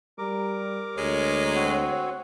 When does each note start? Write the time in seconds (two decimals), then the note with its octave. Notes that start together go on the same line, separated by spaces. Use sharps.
0.18 G3 A#4 D6
0.98 D2 G#3 C#5
1.55 C4 F#4